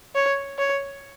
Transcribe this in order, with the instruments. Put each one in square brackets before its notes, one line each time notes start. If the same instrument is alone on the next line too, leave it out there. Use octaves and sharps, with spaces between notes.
[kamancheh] C#5
C#5